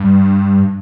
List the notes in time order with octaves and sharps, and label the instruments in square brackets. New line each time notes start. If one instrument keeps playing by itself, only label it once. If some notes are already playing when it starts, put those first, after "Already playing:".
Already playing: [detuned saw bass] G2